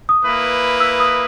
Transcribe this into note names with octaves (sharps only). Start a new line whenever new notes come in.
D#6
A#3 E4 B4
E6
D#6